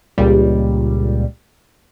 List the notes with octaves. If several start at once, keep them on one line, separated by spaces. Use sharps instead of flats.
C#2 A#2 G3